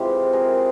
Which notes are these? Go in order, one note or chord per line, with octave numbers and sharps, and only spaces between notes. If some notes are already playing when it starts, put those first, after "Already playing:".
Already playing: C3 E3 G#3 C4 F4 G4
G#4 A#4